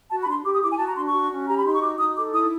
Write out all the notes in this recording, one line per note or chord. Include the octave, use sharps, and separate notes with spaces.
F#4 A5
B5
D4 C6
G4 D6
D#6
E4 D6
G#5
F#4 A5
A#5
D4 C6
C#6
F#4
C#4
G4 A#5
B5
D#4 C6
C#6
F#4 D6
D#4 D#6
A4 D6
E4 D#6